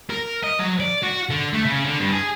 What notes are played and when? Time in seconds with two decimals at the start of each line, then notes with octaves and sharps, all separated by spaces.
0.10 A#4
0.44 D#5
0.60 F#3
0.80 D5
1.03 F#4
1.30 D3
1.53 A3
1.65 C#3
1.85 D3
1.99 G2
2.12 G#4